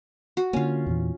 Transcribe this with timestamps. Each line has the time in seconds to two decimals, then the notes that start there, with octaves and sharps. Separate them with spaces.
0.37 F#4
0.53 D3 A#3 C#4 F4
0.86 E2 A#2 E3